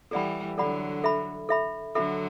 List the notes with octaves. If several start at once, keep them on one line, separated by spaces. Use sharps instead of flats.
E3 G3 A4 D5 F#5 B5
D3 F#3 A4 D5 F#5 B5
A4 E5 B5
A4 E5 B5
D3 F#3 A4 E5 B5